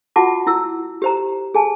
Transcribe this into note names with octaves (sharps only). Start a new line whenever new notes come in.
F4 F#4 F#5 A5 D6
E4 E6
G4 C5 A#5
G#4 G#5 A5